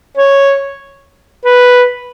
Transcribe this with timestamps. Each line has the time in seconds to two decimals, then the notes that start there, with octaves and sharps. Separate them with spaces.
0.17 C#5
1.45 B4